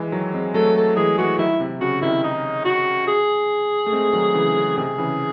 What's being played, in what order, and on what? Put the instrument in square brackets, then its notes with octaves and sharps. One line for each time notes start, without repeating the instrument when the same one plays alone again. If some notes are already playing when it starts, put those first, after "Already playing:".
Already playing: [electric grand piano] E3 G#3
D#3 F#3
G#3 C4
[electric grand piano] F#3 A3 [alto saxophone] A4
[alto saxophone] A4
[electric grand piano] E3 G#3 [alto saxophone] G#4
[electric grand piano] E3 G#3 [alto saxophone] F#4
[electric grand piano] D#3 F#3 [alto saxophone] E4
[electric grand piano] C3
[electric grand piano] C#3 [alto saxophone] F#4
[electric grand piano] C3 D#3 [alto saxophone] E4
[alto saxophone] D#4
F#4
G#4
[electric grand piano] A3
G#3 C4
D#3 F#3
C#3 E3
C#3
[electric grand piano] C3 D#3 [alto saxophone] G#4
[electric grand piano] C#3 E3